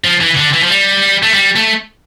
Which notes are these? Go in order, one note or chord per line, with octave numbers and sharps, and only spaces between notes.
F3
E3
D3
E3
F3
G3
A3
G3
A3